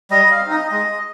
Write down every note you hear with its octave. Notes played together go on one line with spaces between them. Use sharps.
G3 D#5
F5
C4 D#4
D#5
G#3 D#5